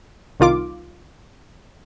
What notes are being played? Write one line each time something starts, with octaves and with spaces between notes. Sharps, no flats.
C2 D#3 F4 D6